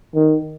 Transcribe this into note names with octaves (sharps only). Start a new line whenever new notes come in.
D#3